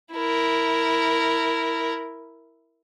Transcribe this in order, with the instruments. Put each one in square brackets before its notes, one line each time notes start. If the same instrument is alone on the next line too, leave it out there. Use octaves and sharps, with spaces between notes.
[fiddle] E4 A#4